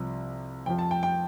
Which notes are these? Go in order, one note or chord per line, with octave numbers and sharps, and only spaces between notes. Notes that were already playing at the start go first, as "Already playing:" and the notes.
Already playing: C2 C3 F3
F2 F3 G5
A5
G5
G5